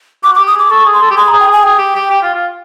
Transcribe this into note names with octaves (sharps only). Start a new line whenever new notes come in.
F#4 D6
D6
G4
D#6
G#4 D6
A4 C#6
G#4
C6
A4
G4
G#4 C6
A#5
G#4
G5
G#4 G#5
G#4 G5
G4
G4
G4
F4
F4